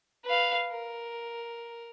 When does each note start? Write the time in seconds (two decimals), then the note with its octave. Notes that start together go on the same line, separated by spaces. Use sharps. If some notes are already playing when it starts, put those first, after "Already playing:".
0.25 B4 F5
0.71 A#4